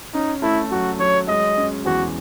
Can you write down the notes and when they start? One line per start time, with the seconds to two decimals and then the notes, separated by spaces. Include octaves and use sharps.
0.14 C#4 D#4
0.42 A3 E4
0.71 F#3 F#4
0.99 F#3 C#5
1.28 G#3 D#5
1.57 C#4
1.85 E2 F#4